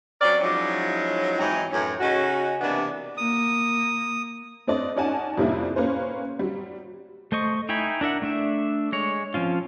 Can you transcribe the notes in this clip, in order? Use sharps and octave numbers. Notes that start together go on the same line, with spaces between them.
F#3 C4 C#4 A#4 D5
F3 F#3 G#3 C#4 D#4 E4
G#2 E3 F#3 C4 D#4
F#2 A2 E3 C#4
C#3 C#4 D#4 F#4
C3 E3 A#3 B3 D4
A#3 D#6
A3 C4 D4 D5 D#5
C#4 D#4 D5 F#5 G#5 A5
F2 C3 G3 A#3 D4 E4
A#3 C#4 B4 C5
F#3 G3
A3 C5 D#5 C#6
D#4 E4 G5 G#5 B5
D4 A#4 E5 F#5
A3 D4 E5
G#3 C#5
F3 C4 C#4 F4